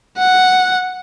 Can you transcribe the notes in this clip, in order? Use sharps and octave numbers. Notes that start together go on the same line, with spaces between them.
F#5